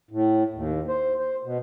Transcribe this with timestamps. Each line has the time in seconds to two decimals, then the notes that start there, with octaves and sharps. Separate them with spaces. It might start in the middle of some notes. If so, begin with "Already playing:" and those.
0.11 A2
0.54 D#2
0.88 C5
1.18 C5
1.45 B2